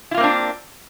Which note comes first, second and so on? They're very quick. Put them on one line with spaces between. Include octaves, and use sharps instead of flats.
E4 F4 A#3 C4 D4